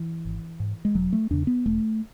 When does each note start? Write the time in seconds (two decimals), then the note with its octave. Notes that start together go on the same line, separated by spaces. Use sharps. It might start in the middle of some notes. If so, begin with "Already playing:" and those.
Already playing: E3
0.25 G#1
0.60 G#2
0.85 G#3
0.95 E1 F#3
1.13 A3
1.30 E2 C#3 D4
1.47 B3
1.66 E1 A3